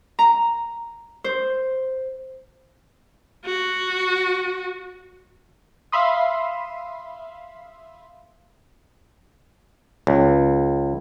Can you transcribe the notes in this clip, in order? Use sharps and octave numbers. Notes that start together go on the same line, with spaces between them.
A#5
C5
F#4
E5 F5 B5 C6 D#6
C#2